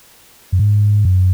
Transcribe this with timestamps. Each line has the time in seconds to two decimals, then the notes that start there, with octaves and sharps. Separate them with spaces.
0.52 F#2
0.59 G#2
1.05 F#2